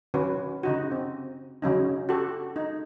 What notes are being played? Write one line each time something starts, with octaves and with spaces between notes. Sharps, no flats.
D#3 F#3 C#4 F#4 B4
C#3 D#4 F#4
C4
C#3 F#3 C#4 D#4
F#4 G4 A4
D#4